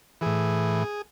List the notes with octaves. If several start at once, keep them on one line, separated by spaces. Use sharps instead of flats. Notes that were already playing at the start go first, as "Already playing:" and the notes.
A2 E3 G#4